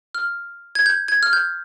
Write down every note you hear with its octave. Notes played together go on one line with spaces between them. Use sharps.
F6
G#6
G6
G#6
F6
G6